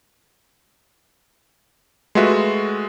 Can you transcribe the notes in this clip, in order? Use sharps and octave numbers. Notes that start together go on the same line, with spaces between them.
G#3 A3 F4 F#4 B4 E5